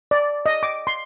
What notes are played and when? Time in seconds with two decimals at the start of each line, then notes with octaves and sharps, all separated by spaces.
0.11 D5
0.46 D#5
0.63 D6
0.87 C6